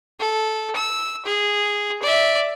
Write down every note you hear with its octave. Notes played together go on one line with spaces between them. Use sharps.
A4
E6
G#4
D5 E5